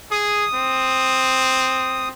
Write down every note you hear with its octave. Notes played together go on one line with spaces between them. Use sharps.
G#4 D#6
C4